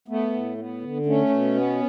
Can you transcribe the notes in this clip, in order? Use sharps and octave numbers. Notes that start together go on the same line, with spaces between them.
A3 B3
A2
B3
D3
A3 C#4
B2
B3